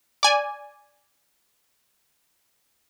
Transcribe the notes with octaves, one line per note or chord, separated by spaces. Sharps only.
D5 G#5